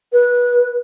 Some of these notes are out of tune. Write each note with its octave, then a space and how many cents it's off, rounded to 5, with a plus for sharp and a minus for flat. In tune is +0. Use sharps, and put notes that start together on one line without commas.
B4 -20